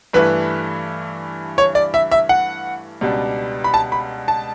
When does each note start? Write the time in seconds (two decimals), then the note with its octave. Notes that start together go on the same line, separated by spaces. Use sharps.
0.13 G2 E3 A3 E4 B4
1.58 C#5
1.75 D5
1.94 E5
2.11 E5
2.29 F#5
3.01 C#2 B2 G3 D4
3.64 B5
3.74 A5
3.92 B5
4.28 A5